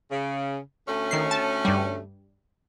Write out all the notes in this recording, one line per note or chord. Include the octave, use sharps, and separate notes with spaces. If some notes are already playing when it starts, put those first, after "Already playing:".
C#3
D2 A3 C#4
D#3 C7
A5
G2 G3